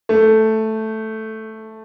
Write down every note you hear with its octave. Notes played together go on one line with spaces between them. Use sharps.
A3